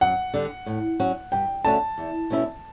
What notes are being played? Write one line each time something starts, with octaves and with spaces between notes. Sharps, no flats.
F#2 F#5
D3 G3
A2
F#3 C#4 F#4
G2 G5
D3 A3 C#4 F#4 A5
E2
B2 A3 C#4 E4